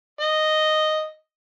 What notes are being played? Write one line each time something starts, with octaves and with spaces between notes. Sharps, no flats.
D#5